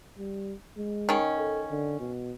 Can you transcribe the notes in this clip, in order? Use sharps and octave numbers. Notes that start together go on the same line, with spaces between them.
G3
G#3
D#3 C#4
A4
D3
B2